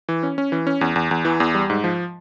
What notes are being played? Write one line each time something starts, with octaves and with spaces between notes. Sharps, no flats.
E3
C#4
C#4
E3
C#4
E2
E2
E2
E3
E2
G3
G#2
F3